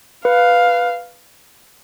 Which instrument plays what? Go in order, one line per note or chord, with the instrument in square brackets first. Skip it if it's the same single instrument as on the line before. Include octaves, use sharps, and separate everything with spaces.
[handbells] B4 [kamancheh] F5